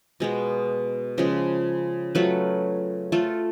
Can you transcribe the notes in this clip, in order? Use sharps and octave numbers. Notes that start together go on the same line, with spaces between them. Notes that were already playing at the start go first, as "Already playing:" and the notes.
B2 G#3 B3
C#3 F3 G#3
F#3 A3 F4 B4
A3 F4 A4